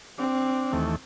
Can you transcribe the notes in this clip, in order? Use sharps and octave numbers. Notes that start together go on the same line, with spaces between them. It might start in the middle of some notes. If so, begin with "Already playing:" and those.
C4 D4
D#2 E3 A3